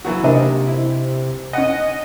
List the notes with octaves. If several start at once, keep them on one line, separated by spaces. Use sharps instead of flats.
E3 F#3 F#4
C3 A#3 D4 D#5
E4
C#4 D#5 F#5